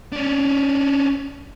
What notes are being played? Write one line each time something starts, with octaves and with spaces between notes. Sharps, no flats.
C#4 D4